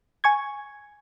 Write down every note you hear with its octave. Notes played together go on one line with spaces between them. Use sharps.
G#5 C#6 G#6